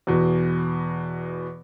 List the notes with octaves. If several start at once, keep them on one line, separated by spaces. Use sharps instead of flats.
E2 B2